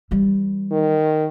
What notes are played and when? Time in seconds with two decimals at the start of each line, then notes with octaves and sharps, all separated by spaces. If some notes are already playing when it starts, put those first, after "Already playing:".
0.11 E3 G3
0.72 D#3